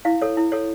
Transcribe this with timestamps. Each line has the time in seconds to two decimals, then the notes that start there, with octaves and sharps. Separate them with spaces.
0.05 E4 F5
0.22 A4 C#5
0.37 E4
0.52 A4 C#5